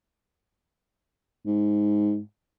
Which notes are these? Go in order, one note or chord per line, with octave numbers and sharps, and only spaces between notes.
G#2